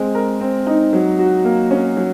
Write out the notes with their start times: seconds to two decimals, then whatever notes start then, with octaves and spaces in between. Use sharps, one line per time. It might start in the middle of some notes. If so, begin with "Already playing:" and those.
Already playing: G#3 C4
0.15 A#4
0.40 C4
0.67 D#4
0.93 F#3
1.19 F#4
1.45 A#3
1.71 C#4
1.97 F#3